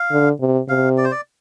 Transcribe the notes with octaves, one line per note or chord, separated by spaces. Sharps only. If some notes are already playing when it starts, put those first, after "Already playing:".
Already playing: F5
D3
C3
C3 F5
D5
C5
D5